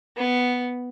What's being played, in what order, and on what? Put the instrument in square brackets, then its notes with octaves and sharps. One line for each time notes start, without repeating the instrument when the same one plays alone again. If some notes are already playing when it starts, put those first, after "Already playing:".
[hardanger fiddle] B3